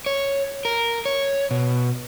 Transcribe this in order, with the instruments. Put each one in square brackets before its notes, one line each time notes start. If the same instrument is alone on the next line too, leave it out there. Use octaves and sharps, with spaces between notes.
[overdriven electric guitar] C#5
A#4
C#5
B2